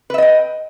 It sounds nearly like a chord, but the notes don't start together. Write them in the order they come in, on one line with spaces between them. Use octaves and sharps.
B4 E5 D#5 G5